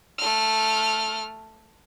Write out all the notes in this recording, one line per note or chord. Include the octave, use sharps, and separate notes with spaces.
A3 F6